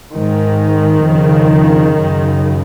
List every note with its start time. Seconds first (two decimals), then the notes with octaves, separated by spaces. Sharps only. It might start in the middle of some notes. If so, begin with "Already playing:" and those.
0.15 G#2 D#3
1.05 F2 C#3
1.95 F#2 C#3